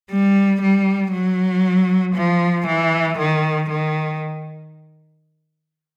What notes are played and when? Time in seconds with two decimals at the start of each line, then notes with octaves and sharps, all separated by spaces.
0.10 G3
0.61 G3
1.13 F#3
2.15 F3
2.66 E3
3.18 D#3
3.70 D#3